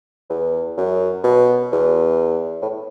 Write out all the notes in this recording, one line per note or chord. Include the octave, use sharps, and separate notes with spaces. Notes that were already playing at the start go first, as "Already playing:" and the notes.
E2
F#2
B2
E2
A2